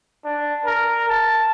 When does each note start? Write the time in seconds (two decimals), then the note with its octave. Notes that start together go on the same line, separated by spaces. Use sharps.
0.25 D4
0.65 A#4
1.09 A5